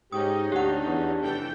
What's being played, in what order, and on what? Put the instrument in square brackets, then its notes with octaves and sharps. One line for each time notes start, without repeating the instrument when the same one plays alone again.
[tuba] G#2 [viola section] C#4 D#4 [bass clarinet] G4 [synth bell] D#6
[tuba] D2 [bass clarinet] D4 [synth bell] G4 F#5
[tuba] E2
[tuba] F1 [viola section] E3 A4 G5